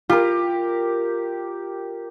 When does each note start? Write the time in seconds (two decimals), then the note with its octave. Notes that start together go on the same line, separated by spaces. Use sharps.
0.09 F4 G4 A#4